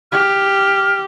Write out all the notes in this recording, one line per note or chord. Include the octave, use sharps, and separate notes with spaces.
G4 F6